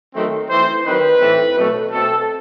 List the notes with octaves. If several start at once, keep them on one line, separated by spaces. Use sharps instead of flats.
D#3 F#3 A3 C4
E3 A3 C4 C5
D#3 F#3 C4 B4
A2 E3 A3 C4
B2 F#3 A3 C4
B2 A3 C4 A4